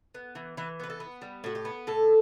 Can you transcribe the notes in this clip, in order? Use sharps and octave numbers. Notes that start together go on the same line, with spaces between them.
B3
E3
E3 B4
B3 B4
A4
B3
G3
A2 F#4
G4
B3
A2 A4